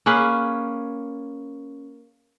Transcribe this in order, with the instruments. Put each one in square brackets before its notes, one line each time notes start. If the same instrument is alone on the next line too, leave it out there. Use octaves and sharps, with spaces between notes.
[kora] A#3 C#4 G#4 B4